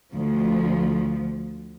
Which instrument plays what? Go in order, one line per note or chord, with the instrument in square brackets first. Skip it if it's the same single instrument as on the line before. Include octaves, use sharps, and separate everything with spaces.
[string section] D2 F3